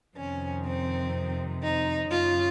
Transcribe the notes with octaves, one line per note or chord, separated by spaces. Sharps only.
F2 C3 D#3 C#4
C4
D#4
F#2 C#3 F4